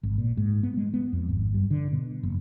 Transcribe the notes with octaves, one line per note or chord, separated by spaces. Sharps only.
G#1
A#2
G#2
B3
G#3
B3
F2
G#1
G2
D3
B2
F#1